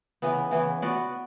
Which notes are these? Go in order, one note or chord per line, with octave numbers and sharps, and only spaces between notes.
C#3 E3 B3
C#3 E3 B3
B3 F#4 B4 D5